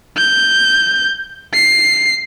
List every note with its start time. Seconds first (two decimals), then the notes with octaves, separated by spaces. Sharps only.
0.17 G6
1.54 C7